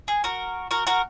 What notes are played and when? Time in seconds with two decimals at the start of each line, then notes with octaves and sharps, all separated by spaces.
0.08 G#4
0.24 F#4 A#4
0.71 F#4 A#4
0.87 F#4 A#4